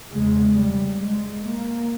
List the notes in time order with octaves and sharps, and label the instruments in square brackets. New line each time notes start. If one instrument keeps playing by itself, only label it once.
[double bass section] E2 C#3 G#3
G3
G#3
A#3